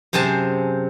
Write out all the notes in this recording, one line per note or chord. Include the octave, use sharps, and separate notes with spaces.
F#2 C3 G#4 C5 A5